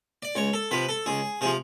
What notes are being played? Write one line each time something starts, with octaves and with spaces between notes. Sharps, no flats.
D5
C#2 C#5
A4
C3 F3 B4
A4
C#2 G#4
C3 F3 G#4